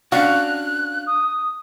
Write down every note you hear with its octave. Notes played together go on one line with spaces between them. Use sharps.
C#4 D4 F#4 F5 F#6
D#6